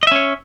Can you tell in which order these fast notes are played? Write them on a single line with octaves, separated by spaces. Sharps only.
D#5 E5 C#4 C#5